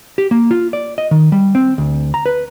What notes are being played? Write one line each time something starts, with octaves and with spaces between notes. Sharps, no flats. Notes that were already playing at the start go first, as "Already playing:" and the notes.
G4
A#3
F4
D5
D#5
D#3
G3
C4
D2
A#5
B4